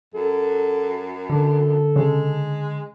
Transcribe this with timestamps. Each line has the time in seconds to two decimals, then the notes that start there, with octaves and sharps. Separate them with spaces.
0.14 F#2 A4
1.29 D3 A4
1.96 C#3 G#3